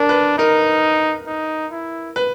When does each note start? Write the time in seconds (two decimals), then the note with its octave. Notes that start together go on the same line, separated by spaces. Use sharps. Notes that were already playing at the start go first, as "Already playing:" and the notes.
Already playing: D4 A#4
0.09 B4
0.38 D#4 A#4
1.27 D#4
1.72 E4
2.16 B4